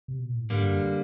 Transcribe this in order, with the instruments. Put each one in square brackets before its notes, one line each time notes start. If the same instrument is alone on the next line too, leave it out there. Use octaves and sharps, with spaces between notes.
[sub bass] C3
B2
A#2
A2
[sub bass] G#2 [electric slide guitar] D3 G3 A#3
[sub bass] G2
F#2